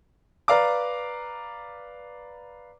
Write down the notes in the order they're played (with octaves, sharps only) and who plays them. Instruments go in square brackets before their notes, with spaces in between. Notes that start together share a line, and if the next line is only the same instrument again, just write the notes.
[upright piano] B4 D5 F5 A#5 D6